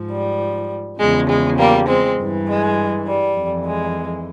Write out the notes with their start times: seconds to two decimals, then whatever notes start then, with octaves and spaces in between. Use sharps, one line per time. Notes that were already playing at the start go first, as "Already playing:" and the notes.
Already playing: G#2 F3
0.10 G3
0.99 E2 C#3 F3 G#3
1.29 G#3
1.59 G3 A#3
1.88 G#3 C4
2.18 G2 E3
2.48 G#3
3.07 G3
3.36 F2 E3
3.66 G#3